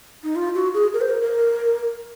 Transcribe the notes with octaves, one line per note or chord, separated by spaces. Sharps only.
D#4
F4
F#4
G#4
A#4
C5
A#4
A#4